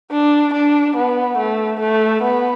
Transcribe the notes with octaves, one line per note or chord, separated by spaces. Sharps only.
D4
D4
B3
A3
A3
B3